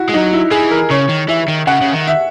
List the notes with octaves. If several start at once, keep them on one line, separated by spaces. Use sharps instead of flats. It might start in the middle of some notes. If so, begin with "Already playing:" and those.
Already playing: E4 F#4
G#3
F#3 D#4
E4
E3 G#4
A#4
C#3 C#5
D#3
E3 E5
D#3
C#3 F#5
C#3
D#3
E5